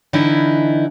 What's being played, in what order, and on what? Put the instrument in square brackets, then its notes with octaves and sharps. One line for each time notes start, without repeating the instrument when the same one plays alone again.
[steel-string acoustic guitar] D3 E3 D#4 E4